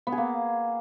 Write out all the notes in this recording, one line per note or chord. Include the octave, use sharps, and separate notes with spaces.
B3
G#4
A#3